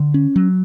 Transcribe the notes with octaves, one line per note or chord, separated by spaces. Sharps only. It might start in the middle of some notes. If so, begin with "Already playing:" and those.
Already playing: D3
C#4
F#3